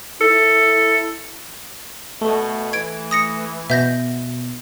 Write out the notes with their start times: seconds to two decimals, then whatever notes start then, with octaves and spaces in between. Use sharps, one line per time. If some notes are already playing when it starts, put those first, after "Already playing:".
0.21 E4 A4
2.21 B2 A3
2.73 E3 G#6 D7
3.11 D#6 A#6 C#7
3.70 B2 E5 G6 A#6